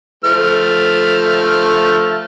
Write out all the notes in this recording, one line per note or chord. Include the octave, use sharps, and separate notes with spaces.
F3 A3 F6